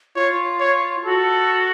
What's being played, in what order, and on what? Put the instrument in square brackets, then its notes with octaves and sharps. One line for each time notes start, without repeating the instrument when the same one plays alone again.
[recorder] F4 [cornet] C#5
[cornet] C#5
[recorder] F#4 [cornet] A4